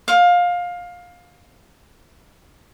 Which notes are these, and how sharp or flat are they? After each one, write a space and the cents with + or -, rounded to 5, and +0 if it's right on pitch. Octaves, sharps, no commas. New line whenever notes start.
F5 +20